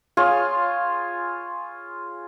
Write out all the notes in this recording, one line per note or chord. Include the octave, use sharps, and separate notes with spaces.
F4 G#4 C#5